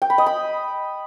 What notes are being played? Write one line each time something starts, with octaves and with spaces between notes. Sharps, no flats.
G5
B5
D#5
B5